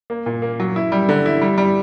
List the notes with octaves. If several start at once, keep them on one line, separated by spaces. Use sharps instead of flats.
A#3
A#2
A#3
F#3
E4
G3
D3
E4
G3
G3